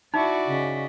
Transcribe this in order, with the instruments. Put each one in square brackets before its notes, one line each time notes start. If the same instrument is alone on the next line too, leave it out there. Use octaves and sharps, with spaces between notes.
[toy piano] D#4 [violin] E4 C#6 [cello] F#4 D5
[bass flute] C#3 [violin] D#5 B6